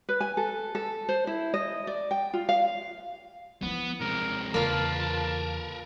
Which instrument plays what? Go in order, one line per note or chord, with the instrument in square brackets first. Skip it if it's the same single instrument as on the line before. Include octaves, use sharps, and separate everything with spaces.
[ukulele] B4
G#5
A4
A4
C5
E4
D#5
D5
G5
F4
F5
[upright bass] F3 E4 [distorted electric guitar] B3
[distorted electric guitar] C3 G#3 [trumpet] A#4
[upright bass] E2 C#3 [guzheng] A#3 F4 [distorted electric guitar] A#4 B4 [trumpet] A5